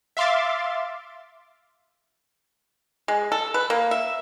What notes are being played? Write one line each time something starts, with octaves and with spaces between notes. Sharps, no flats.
E5 F5 C6 D6 A6
G#3
A4
B4
A#3
E5